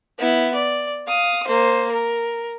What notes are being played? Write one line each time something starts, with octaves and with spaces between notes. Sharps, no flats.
B3 E4
D5
F5 D#6
A#3 C5
A#4